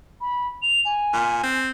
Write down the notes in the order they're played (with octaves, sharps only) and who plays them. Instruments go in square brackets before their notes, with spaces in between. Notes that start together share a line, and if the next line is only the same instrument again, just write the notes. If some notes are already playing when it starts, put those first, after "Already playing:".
[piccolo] B5
F7
G#5
[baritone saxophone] A#2
C4